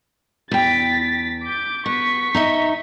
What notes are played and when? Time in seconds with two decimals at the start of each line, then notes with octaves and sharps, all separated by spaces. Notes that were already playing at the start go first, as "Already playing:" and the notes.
0.51 E2 G5 A6 B6
1.44 D6 G6
1.86 B3 C#6 B6
2.35 D#4 D#5 E5